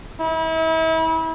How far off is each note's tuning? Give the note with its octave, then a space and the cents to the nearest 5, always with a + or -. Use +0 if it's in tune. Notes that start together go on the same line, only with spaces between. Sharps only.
E4 -35